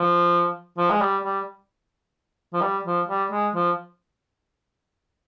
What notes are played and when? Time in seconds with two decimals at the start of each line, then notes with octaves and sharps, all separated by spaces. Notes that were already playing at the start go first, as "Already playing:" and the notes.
Already playing: F3
0.78 F3
0.90 G#3
1.01 G3
1.24 G3
2.53 F3
2.61 G3
2.85 F3
3.08 G3
3.31 G#3
3.55 F3